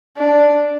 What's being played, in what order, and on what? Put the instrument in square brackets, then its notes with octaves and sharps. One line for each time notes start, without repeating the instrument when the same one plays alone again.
[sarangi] D4